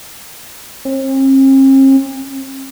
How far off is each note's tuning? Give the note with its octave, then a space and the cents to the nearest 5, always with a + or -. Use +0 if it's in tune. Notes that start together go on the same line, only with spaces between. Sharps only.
C4 +45